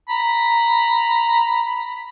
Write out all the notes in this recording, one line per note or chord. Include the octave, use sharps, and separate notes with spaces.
A#5 B5